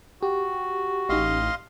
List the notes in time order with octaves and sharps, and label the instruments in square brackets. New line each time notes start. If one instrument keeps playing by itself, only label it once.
[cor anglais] F#4 [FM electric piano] G4
[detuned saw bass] A1 [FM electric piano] D#4 G4 [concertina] D#5 F5 C6